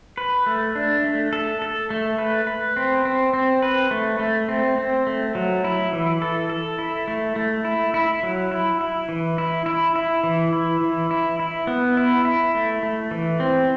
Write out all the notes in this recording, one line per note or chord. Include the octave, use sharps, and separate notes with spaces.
B4
A3
D4
A3
A4
A4
A3
B4
B4
C4
C4
C4
B4
A3
A3
C4
C4
A3
F#3
E4
E3
A4
A4
E4
A3
A3
E4
E4
F#3
E4
E4
E3
E4
E4
E4
E3
E4
E3
E4
E4
B3
E4
E4
A3
A3
E3
C4